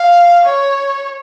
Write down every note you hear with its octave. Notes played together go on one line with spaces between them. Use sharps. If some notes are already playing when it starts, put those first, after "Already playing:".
Already playing: F5
C#5